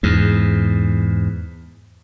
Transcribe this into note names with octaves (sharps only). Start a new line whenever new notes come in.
E2 G#2